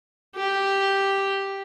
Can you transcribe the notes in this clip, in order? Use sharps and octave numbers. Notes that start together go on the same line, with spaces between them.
G4